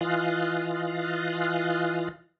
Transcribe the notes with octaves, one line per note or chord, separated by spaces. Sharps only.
E3 F4 D#5 F5 F#6